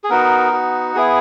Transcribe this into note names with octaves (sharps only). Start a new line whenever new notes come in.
G#4
B3 D#4 F#4 A#4
F#4
B3 E4 G#4